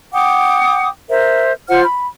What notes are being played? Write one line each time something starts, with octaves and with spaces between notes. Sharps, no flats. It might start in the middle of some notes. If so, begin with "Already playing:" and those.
F#5 G5 D6 D#6
A#4 C5 E5
F4 C5 F#5 F6
B5